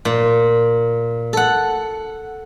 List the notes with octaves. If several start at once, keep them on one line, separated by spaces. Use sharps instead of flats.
A#2
A4 F#5